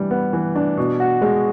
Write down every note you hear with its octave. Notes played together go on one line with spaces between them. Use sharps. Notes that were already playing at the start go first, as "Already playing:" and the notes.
Already playing: E3 G3 D4
B3
E3
D4
B2
F#4
G#3